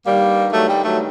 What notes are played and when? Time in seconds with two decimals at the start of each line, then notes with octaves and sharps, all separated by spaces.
0.06 G2 D#3 G3 A#3
0.53 F#3 A3
0.68 G3
0.84 F#3 A3